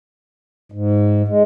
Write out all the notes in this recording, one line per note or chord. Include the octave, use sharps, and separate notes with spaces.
G#2
G#3